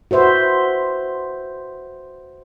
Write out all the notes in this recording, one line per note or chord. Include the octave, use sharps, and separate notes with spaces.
F#4 B4 C5 E5